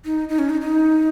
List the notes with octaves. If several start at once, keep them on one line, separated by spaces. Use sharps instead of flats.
D#4
D#4
C#4
D#4
D#4